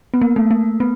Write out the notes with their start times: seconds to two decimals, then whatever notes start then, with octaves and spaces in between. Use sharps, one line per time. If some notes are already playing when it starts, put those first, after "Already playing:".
0.14 B3
0.22 A#3
0.36 A3
0.51 A#3
0.80 B3